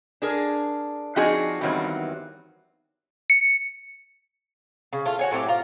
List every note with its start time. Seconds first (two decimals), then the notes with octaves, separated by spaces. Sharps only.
0.22 D4 G#4 A#4
1.16 F3 C4 D4 D#4 F#4 G#4
1.61 E2 G2 D#3 F#3 G3 C4
3.30 C#7
4.93 C#3
5.06 A3 F4
5.19 F#4 C#5 G#5
5.31 A2 F#3 C4 G4
5.48 F4 A#5